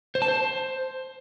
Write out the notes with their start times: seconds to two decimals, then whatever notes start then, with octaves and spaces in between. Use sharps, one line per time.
0.15 C5
0.22 A5
0.28 C5